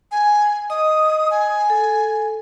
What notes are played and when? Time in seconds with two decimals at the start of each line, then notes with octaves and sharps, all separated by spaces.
0.12 G#5
0.70 D#5 D#6
1.31 G#5
1.70 A4